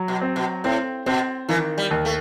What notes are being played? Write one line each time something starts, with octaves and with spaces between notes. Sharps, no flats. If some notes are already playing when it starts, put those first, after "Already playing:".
Already playing: F#3
B2
C4
B2
A2 C4
B2 C4
D#3 E3
G3
D#2
A3